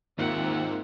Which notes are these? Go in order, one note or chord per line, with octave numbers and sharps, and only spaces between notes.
D#2 G#2 A#3 C4 D#4 F4 E5 F#5